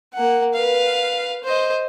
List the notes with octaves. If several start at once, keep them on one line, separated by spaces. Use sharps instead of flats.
A#3 F#5
B4 F5
C5 D#5